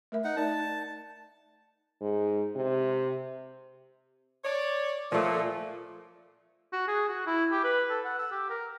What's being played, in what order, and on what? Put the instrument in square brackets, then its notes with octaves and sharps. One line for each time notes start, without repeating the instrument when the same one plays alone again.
[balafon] A3 A#4 E5
[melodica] D#4 F#5
[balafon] D#4 A#4 D5 [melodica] A5
[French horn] G#2
C3
[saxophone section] C#5 D5
[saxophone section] A#2 [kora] F3 A3
[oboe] F#4
G#4
F#4
E4
G4
B4
A4
F#5
E6
G4
A#4